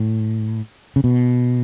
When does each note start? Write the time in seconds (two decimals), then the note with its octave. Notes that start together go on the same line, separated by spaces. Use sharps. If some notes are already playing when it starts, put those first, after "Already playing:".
Already playing: A2
0.96 C#3
1.04 B2